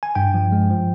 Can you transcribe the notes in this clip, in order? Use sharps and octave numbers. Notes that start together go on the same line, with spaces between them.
G#5
G2 G5
F3
G#3
F3